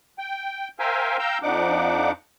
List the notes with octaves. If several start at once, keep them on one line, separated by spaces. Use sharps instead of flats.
G5
A#4 C5 E5 F5 G5 G#5
F5 G5 A#5 E6 G6
F2 F3 D4 D#4 F#5 D6